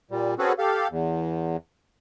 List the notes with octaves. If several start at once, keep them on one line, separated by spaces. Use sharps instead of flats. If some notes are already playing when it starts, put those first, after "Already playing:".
A#2 G3
C4 C#4 F#4 G#4 A4 B4
G4 A4 F5
E2